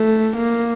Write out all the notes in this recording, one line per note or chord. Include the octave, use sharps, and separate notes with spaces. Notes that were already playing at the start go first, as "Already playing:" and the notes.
Already playing: A3
A#3